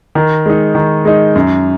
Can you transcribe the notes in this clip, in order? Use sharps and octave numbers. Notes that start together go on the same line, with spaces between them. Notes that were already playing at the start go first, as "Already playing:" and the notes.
D#3
G#3 D#4
D#3
G#3 D#4
F#2